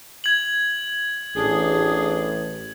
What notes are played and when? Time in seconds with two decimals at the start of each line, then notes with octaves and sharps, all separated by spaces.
0.24 G#6 F#7
1.36 A1 D4 G#4